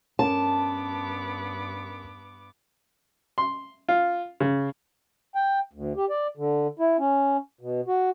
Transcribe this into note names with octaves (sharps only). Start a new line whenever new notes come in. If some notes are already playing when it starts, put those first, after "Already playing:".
G2 B3 C#4 A#4 A5 D6
C6
F4
C#3
G5
D2
G4
D5
D3
E4
C#4
B2
F#4